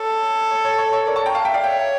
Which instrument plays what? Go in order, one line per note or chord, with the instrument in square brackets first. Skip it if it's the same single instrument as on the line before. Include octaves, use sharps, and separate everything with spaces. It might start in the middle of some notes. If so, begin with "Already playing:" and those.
Already playing: [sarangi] A4 [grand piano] C#5
[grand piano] C#5
C#5
C#5
C#5
A#4 D5
A5 C#6
G5 A#5
F5 A5
E5 G5
D5 F5
[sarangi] C#5 [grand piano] E5 G5